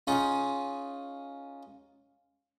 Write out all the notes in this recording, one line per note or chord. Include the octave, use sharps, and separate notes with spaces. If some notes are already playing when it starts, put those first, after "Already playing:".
C#4 D#4 F4 G#4